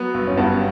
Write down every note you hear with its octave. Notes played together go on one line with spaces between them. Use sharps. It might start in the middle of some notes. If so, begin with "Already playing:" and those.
Already playing: F#3 B3
G1
C#4
G2 B3